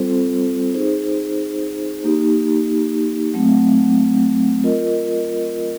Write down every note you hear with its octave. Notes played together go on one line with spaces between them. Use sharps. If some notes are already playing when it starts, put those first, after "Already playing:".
Already playing: G3 C4 F4 A4 C5
D#4 G#4 C5
A#3 D#4 G4
F#3 A3 C4
F4 A#4 D#5